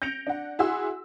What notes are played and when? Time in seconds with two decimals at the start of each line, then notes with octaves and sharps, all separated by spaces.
0.02 G6 A#6 C#7 D7 F7
0.27 D4 F#5
0.59 E4 F#4 G#4 F#5 C6 E6